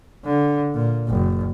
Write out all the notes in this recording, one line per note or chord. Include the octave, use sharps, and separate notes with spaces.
D3
A#2
F#1